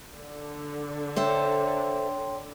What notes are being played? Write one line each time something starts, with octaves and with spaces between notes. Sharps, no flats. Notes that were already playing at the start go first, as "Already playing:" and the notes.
D3
A4 C5 C#5 E5 G5 C6